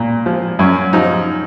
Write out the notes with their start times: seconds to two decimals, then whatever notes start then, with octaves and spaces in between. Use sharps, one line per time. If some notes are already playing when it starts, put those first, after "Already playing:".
Already playing: A#2
0.26 F3
0.59 F#2 C#4
0.93 F3 D#4